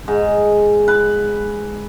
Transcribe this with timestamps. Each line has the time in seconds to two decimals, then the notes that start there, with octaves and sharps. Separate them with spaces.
0.08 G#2
0.88 B4